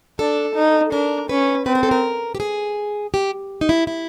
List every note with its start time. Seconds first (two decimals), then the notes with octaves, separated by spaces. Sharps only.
0.19 D4 A4
0.55 D#4
0.92 D4 A#4
1.29 C#4 B4
1.66 C4 B4
1.75 A#4
1.83 A4
1.91 A#4
2.35 G4
2.40 G#4
3.14 G4
3.61 D#4
3.69 E4
3.87 E4